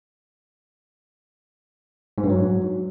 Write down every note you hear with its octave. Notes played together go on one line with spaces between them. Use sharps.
G#2
G2
F#3